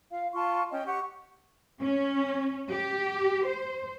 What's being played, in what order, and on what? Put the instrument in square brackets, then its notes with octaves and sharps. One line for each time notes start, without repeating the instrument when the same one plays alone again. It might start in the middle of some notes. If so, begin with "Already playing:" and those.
[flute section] F4 F5
F4 A5 C6 C#6
C#4 D#5 G5
G4 F#5 C#6
[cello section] C#4
G4
C5